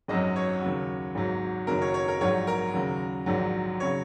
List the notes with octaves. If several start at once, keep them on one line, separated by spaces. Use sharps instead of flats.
G#1 F#2 F#3 D#5
C#5
D#2 C#3 F#3
G#1 G#2 F#3
F#1 F#2 D#3 F#3 A#4
C#5
C#5
A#4
A#1 G#2 F#3 C#5
A#4
D#2 C#3 F#3
A#1 G#2 D#3 F#3
C#3 F#3 C#5